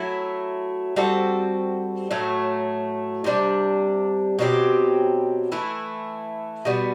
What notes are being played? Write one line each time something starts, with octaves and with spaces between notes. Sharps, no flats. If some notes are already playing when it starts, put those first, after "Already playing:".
Already playing: F#3 A3 E4
G3 C4 F#4 A4
A2 F#3 A3
C3 G3 D4
B2 F#3 C4 G4
E3 A3 E4
B2 G3 B3